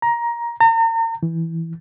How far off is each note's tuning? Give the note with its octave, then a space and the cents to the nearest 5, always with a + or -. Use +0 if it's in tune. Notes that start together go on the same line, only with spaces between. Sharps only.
A#5 +15
A#5 -40
E3 -5